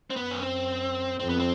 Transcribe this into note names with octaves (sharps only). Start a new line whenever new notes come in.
C4
F#2 B3
C#4
C4
F2 C4
B3
C4